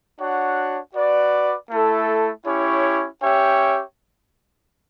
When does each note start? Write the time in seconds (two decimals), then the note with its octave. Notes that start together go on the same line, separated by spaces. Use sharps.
0.19 D4 F#4 C#5 F#5
0.94 F#4 B4 D5
1.70 A3 E4 A4
2.46 C#4 E4 G4 C#5
3.22 C#4 G4 C#5 E5 G5